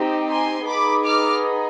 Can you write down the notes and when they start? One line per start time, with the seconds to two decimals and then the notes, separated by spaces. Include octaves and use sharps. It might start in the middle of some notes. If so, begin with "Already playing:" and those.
Already playing: C4 D#4 G4
0.30 G#5 C6
0.68 B3 D#4 G#4 B5 D6
1.05 D6 F6